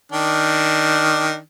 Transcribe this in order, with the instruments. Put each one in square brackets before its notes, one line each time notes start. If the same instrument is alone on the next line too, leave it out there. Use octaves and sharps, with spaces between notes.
[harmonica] D#3 D4